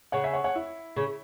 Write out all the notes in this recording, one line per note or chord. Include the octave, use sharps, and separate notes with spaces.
C#3 C#5 F#5
E5 G#5
C#5 F#5
C#5 F#5
E4
C#3